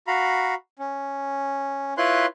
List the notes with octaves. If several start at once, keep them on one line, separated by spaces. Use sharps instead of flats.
F#4 F5 A#5 B5
C#4
E4 F4 B4 C#5 C6 F#6